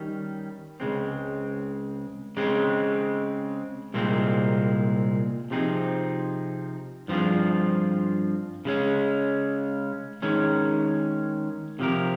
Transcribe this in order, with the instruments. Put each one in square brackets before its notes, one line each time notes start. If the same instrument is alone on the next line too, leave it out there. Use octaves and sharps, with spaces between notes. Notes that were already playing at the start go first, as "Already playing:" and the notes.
Already playing: [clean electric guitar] D#3 G3 C#4
C#2 C#3 G#3 C4
C#3 G#3 C4
C2 A#2 G#3 C4
C3 F3 C4 D#4 G#4
G2 F3 C4 F4 G#4
C#3 G#3 C#4
D#3 G#3 C#4
C3 F3 C4 G4 A#4